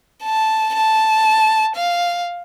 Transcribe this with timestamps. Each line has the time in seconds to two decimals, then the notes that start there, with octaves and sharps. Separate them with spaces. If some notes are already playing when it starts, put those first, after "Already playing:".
0.24 A5
0.75 A5
1.76 F5